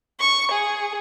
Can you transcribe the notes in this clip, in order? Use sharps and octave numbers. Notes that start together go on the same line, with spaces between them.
C#6
G#4